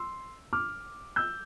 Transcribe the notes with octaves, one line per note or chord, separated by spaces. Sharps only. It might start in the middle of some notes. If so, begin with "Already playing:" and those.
Already playing: C6 E6
D6 F6
E6 G6